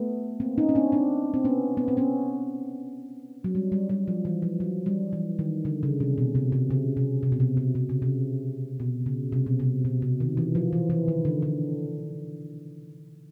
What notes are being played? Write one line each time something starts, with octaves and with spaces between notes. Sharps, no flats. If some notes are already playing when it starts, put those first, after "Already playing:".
Already playing: A3 B3
A#3 C4
C#4 D#4
C#4
C4 D4
C4 D4
C4
B3 C#4
B3
C4
B3 C#4
F#3
G3
G3
G3
F3
E3
F3
F#3
G3
E3
D#3
D3
C#3
C3
B2
C3
C3
C#3
C3
C3
B2
C3
C3
C3
C#3
C3
B2
C#3
C3
B2
C3
B2
C3
D#3
E3
F3
E3
E3
D#3
D3
D3